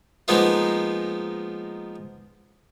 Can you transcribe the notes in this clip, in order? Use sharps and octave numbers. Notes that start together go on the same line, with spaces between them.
F3 G#3 A#3 B3 D#4 F4